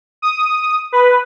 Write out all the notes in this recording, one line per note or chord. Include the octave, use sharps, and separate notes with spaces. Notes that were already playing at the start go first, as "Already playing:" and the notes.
D#6
B4